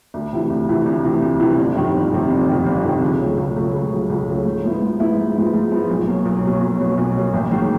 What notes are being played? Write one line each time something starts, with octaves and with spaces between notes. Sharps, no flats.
D2
C3 E3
D2
C3 E3
D2
C3 E3
D2
C3 E3
G1
F2 C3 D#3
G1
F2 C3 D#3
G1
F2 C3 D#3
G1
F2 C3 D#3
C#2
C#3 F#3 A3
C#2
C#3 F#3 A3
C#2
C#3 F#3 A3
C#2
C#3 F#3 A3
G#2
F3 G#3 B3 E4
G#2
F3 G#3 B3 E4
G#2
F3 G#3 B3 E4
G#2
F3 G#3 B3 E4
B1
B2 F#3 A#3
B1
B2 F#3 A#3
B1
B2 F#3 A#3
B1
B2 F#3 A#3
A1
G#2 D#3 F#3 A#3